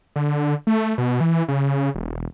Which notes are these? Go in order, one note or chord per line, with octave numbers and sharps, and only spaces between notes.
D3
A3
B2
E3
C#3
E1